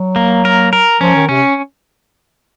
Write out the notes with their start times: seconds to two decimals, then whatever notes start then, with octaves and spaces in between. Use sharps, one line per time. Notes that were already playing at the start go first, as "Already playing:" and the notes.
Already playing: F#3
0.16 A#3
0.45 A#4
0.73 A#4
1.01 F3 C#4
1.15 D#3
1.29 C3 C#4